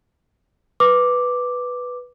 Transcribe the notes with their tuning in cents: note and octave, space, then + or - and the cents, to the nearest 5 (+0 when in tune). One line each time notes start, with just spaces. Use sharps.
B4 +0 D6 +0